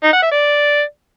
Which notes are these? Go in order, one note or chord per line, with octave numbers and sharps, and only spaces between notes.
D#4
F#5
E5
D5